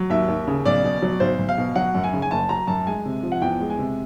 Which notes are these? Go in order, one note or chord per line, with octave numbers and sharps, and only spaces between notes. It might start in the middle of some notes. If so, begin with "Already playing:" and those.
Already playing: F#3
D#2 E5
D#2
C#3
B1 D5
B2
F#3
B1 C5
B1
F5
B2
F#3 F#5
F#2
G#5
C#3
G#5
F#1 A5
F#3 A#5
F#2 A5
G#3 G#5
C3
F3
F#5
E2 G5
G#3
G#5
C3